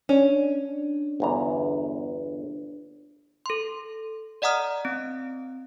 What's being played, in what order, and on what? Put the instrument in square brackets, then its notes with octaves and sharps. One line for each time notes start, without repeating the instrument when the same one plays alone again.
[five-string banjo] C#4 [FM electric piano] D4
[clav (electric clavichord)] G1 E2 A#5
[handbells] A4 C6
D5 D#5 F#5 A#5 D#6 F6
C4